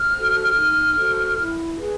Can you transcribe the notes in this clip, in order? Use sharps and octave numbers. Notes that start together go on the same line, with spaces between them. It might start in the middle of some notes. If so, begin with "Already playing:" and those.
Already playing: F6
F#4 A4 C5
D#4
F#4 A4 C5
E4
G#4 B4